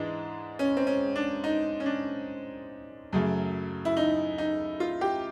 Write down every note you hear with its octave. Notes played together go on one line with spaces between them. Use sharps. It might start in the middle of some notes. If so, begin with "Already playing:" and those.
Already playing: G#2 E3 G#3 D4
C#4
C4
C#4
D4
D#4
C#4
D4
F#2 C#3 F#3 A3
E4
D#4
D#4
F4
G4